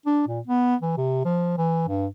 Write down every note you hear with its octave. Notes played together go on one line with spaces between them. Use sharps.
D4
A#2
B3
E3
C3
F3
E3
G2